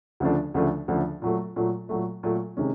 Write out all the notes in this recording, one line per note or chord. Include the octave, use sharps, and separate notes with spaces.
D2 C#3 F3 A3 D4
D2 C#3 F3 A3 D4
D2 C#3 F3 A3 D4
A#2 F#3 A3
A#2 F#3 A3
A#2 F#3 A3
A#2 F#3 A3
C3 D#3 G#3 C#4